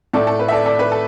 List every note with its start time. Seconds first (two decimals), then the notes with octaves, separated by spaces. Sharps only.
0.13 A2 A3 A4 D5
0.27 A4
0.39 B4
0.48 E5
0.52 A4 D5
0.66 A4 D5
0.79 B4
0.92 A4